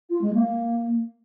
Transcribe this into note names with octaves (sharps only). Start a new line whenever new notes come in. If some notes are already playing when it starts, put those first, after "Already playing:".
F4
G#3
A#3